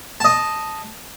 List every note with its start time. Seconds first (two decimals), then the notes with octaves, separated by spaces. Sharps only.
0.20 D#5 A5